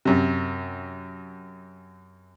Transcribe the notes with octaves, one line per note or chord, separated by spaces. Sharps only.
F#2 C3